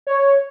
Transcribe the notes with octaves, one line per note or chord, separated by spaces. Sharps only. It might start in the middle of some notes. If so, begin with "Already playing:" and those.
C#5